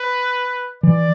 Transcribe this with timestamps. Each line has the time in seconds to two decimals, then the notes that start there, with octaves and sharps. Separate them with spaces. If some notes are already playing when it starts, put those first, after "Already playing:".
Already playing: B4
0.83 E3 D5